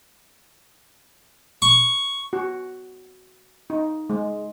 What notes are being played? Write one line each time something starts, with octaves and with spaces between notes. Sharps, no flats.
C#6
F#4
D#4
G#3